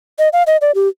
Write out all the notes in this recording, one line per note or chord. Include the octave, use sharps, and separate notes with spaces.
D#5
F5
D#5
D5
G4